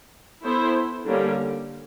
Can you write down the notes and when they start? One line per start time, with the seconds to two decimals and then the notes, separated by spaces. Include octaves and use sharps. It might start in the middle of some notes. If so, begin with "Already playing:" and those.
0.44 B3 E4 A4 C5
1.05 D3 G3 A#3 C#4